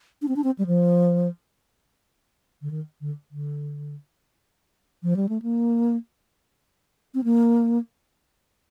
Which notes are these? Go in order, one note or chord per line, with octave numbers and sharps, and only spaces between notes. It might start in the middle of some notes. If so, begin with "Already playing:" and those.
D4
C4
D4
C4
G3
F3
D3
D#3
D3
D3
F3
G3
A3
A#3
C4
A#3